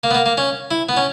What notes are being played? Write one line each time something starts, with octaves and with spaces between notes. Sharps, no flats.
A#3
B3
A#3
A#3
C#4
E4
B3
C#4